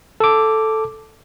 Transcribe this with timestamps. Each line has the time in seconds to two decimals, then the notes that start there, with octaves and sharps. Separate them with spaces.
0.20 A4 D6